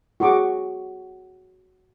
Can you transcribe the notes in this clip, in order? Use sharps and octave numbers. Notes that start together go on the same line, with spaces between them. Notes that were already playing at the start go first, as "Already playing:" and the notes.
F#4 G#4 C#6 D6